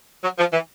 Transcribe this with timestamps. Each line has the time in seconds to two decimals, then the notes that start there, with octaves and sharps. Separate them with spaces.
0.23 F#3
0.39 F3
0.53 E3